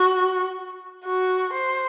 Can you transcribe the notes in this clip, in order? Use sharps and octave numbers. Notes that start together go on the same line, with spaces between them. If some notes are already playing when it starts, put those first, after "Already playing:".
Already playing: F#4
F#4
C5